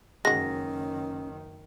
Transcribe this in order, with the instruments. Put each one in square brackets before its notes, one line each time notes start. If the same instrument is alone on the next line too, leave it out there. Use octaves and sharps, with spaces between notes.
[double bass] F#1 D#3 [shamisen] G#3 F#4 [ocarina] C#4 [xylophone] A#6